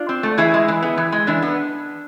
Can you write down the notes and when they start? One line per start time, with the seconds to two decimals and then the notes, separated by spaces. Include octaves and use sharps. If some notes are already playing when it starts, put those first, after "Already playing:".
Already playing: D4 F4
0.09 C4
0.23 A3
0.38 E3 E4 G#4
0.54 G#3
0.68 E3
0.83 B3
0.97 E3
1.12 G#3
1.27 E3 D4
1.42 B3